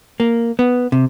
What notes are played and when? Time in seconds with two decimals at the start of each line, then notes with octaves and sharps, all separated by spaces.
0.20 A#3
0.59 B3
0.92 C3